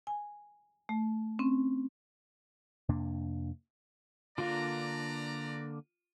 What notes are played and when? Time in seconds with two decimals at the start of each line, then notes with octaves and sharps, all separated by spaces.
0.07 G#5
0.89 A3
1.39 C4 C#4
2.89 F2 C3 A#3 D4
4.38 D3 A#3 D4 F4 B4 D5 A#5